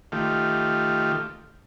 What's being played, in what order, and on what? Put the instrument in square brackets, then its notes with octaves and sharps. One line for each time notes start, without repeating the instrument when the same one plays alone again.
[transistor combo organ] D#3 A3 F4 G4